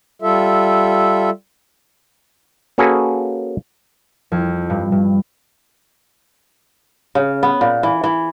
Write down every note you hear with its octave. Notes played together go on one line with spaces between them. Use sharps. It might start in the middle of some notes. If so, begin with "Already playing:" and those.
G3 F4 A4 E5
A#3 C#4 F#4 G#4 A4 B4
F2
G2
G2
C#3
B3
A#2
E3
E3